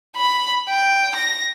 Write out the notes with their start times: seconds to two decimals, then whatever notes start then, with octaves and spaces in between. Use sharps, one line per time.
0.16 B5
0.69 G5
1.16 A#6